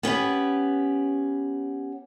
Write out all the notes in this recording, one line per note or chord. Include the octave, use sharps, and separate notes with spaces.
B3 C#4 G4 B4